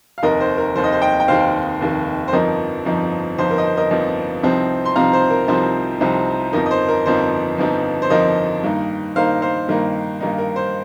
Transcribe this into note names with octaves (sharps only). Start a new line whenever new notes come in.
F5
F1 D#2 D#3 A#4 D#5
C5
A#4
F1 D#2 D#3 C5
D#5
C5
D#5 G5
G5
F1 D#2 D#3 C5 F5
F1 D#2 D#3
C5
G1 F2 F3 D#4 A#4 D#5
G1 F2 F3 D#4
G1 F2 F3 D#4 C5
A#4
D#5
C5
A#4 D#5
G1 F2 F3 D#4
C2 C3 F3 C4 D#4
C6
C2 C3 F3 C4 D#4 F5 A#5
C5
A#4
C2 C3 F3 C4 D#4 C5
C2 C3 F3 C4 D#4
G1 F2 F3 D#4 A#4 D#5
D#5
C5
A#4
G1 F2 F3 D#4 C5
G1 F2 F3 D#4
C5
G1 F2 F3 D#4 A#4 D#5
G2 D#3 A#3 D#4
G2 D#3 A#3 D#4 C5 F5
C5 F5
G2 D#3 A#3 D#4
G2 D#3 A#3 D#4
A#4
C5